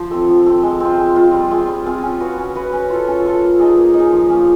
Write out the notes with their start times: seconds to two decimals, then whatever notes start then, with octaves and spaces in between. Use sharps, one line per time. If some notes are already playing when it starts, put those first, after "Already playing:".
Already playing: F3 C5
0.11 A3 C4
0.29 F3
0.46 A3 C4
0.63 G#3
0.80 C4 F4
0.98 G#3
1.16 C4 F4
1.33 G3
1.50 C4 F4 G#4
1.67 G3
1.85 C4 F4 G#4
2.02 C#4
2.20 F#4 B4
2.38 C#4
2.55 F#4 B4
2.72 C#4
2.90 F4 A4
3.07 C#4
3.25 F4 A4
3.42 A#3
3.60 D#4 G#4
3.77 A#3
3.94 D#4
3.99 G#4
4.12 F3
4.29 A#3 C#4